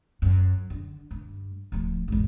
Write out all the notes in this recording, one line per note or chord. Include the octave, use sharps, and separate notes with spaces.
F#2
D3
G2
D1 F3
G#1 E2